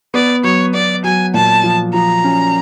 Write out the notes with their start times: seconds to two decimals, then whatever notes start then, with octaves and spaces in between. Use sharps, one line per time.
0.14 B3 D5
0.44 F#3 C#5
0.74 B3 D5
1.04 F#3 G#5
1.34 A#2 A5
1.64 F3
1.93 F3 A#5
2.24 C#4